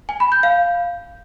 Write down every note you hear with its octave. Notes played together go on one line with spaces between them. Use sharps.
G#5
B5
G6
F5